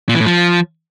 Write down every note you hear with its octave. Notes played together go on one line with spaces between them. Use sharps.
A#2
E3
A2
F3